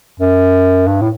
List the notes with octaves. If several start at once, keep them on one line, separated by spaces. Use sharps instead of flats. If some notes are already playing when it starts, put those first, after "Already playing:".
F#2
G2
A2